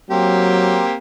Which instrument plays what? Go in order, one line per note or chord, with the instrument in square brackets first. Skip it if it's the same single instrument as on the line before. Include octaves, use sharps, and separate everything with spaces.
[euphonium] F#3 [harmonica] A#3 C4 G4